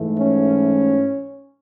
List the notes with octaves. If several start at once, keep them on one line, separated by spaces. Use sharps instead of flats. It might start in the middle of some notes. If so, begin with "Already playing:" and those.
Already playing: G#2 E3 A3
C#4